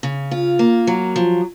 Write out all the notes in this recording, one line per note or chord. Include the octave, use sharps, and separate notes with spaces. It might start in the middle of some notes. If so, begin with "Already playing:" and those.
C#3
F4
A#3
F#3
F3